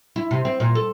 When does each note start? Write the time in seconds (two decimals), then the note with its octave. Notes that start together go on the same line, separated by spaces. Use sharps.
0.16 E4
0.31 C3
0.45 C4
0.60 A#2
0.75 A4